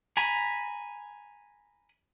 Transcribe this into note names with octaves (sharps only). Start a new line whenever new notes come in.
G#5 A#5 B5